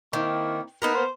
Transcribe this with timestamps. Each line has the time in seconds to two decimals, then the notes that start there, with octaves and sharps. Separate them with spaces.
0.13 D#3 A#3 C4 E4
0.82 A#3 B3 D#4 A#4 B4
0.95 C5